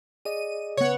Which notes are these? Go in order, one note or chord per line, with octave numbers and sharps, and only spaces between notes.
G#4 D5 D#5 D#7
C#3 B3 C#5 F#5